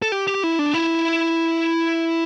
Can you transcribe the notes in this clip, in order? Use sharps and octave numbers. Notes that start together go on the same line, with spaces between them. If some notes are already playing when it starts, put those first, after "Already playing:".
A4
G4
G4
E4
D4
E4